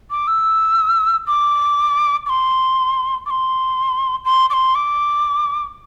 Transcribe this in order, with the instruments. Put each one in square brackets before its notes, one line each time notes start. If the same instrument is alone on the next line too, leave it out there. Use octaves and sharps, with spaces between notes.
[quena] D6
E6
D6
D6
C6
D6
C6
C6
D6
C6
D6